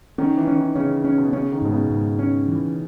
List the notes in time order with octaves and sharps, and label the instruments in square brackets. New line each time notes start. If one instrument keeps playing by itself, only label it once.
[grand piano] D#3 [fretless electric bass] C#4
[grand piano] E3
[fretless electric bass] C#4
[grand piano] D#3
[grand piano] C#3 [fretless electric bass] C#4
[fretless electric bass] C#4
[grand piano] B2
[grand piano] C#3 [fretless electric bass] C#4
[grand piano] D#3
[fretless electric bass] G#2 [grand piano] B2
[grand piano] C#3
[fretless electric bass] G#2
C#4
E3